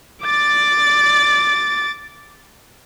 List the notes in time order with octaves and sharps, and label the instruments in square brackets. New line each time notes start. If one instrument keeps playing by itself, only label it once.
[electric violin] D6 A6